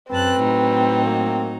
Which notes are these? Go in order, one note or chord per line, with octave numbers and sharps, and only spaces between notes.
F#2 C4 B4 A5 F#6
A2 F#3 D#4
A#3